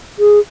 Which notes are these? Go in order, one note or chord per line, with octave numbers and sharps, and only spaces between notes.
G#4